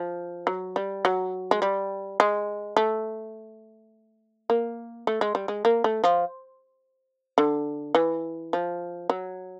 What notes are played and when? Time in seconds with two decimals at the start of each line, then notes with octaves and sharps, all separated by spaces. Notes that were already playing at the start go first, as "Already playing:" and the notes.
Already playing: F3
0.47 F#3
0.76 G3
1.05 F#3
1.51 G#3
1.62 G3
2.20 G#3
2.77 A3
4.50 A#3
5.07 A3
5.21 G#3
5.35 G3
5.48 G#3
5.65 A#3
5.84 A3
6.04 F3
7.38 D3
7.95 E3
8.53 F3
9.10 F#3